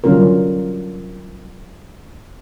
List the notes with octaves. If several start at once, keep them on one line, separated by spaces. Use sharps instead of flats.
D3 F#3 G3 C#4 F4 A#4